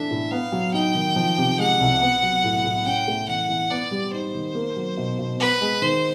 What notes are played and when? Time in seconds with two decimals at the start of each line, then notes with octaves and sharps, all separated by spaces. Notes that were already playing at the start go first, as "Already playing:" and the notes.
Already playing: E3 A3 D4 E5
0.11 A2
0.31 B3 F5
0.52 F#3
0.73 D#4 G5
0.95 D#3
1.16 F3
1.38 C3
1.59 G#3 F#5
1.81 C2
2.01 B3
2.23 F#3
2.44 A2
2.65 A2
2.85 C#4 G5
3.08 A3
3.28 E3 F#5
3.49 E3
3.71 B3 D5
3.91 G3
4.13 D#4 C5
4.35 D#3
4.55 A#3
4.77 F#3
4.97 B2
5.19 B2
5.40 B3 B4
5.61 G#3
5.82 D#3 C5